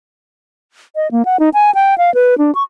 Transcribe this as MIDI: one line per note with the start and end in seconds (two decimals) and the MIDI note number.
0.96 1.10 75
1.11 1.25 58
1.25 1.39 78
1.40 1.49 63
1.54 1.74 80
1.75 1.97 79
1.98 2.13 77
2.14 2.37 71
2.38 2.54 62
2.55 2.63 85